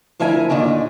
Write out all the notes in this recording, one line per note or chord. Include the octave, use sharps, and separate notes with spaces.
D2 F3 E4 A#4 G#5
D#2 A#2 D3 D#3